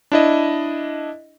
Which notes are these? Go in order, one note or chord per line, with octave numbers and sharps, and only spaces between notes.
D4 E4 D#5